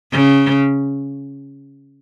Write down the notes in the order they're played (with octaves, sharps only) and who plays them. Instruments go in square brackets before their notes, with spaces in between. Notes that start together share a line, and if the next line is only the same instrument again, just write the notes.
[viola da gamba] C#3